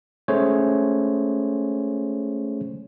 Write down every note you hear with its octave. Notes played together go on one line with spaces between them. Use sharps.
G#3 A3 C#4 G#4 C5 C#5